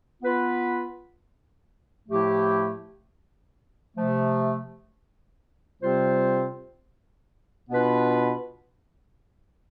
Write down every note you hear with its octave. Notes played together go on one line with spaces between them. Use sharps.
B3 F4 B4
A2 F3 A3 E4 G4
C3 F3 A3
C3 G3 C4 F4 C5
B2 B3 D4 F4 B4